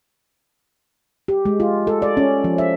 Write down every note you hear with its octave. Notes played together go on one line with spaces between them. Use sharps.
G4
G#3
F4
A4
D5
C#4
F3
E5